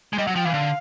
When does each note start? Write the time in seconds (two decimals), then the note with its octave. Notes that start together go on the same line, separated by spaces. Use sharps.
0.13 G#3
0.18 G3 D#5
0.27 F#3 F#5
0.36 F3 G5
0.45 E3 F5
0.54 D3